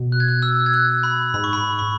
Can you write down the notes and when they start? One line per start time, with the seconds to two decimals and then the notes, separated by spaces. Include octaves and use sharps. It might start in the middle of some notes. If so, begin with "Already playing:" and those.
Already playing: B2
0.12 F#6
0.20 G#6
0.28 F#6
0.42 E6
0.66 G#6
0.74 F#6
1.03 B5
1.34 G#2 B5
1.44 C#6
1.53 B5
1.79 C#6